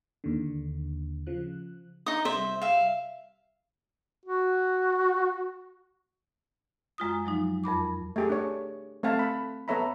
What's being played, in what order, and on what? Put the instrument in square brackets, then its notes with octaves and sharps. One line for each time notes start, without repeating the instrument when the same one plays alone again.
[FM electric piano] D#2 D3
C#3 F3 F#6
[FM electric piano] D4 [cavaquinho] D#4 D#6
[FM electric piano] C3 G3 [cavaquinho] C5 E5
[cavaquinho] E5 F5
[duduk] F#4
[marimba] F#2 G#3 F4 D#6
F3 F#3 G#3 D#4
F2 A#4 B5 D6
[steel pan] A3 G4 G#4
D4 C#5
A3 C4 E5 F5 A5
B5
B3 A4 C#5 E5 A#5 B5